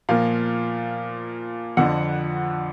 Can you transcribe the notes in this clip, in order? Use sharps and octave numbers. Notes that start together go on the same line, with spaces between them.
A#2 F3 A#3 F5
F2 D3 F3 F#5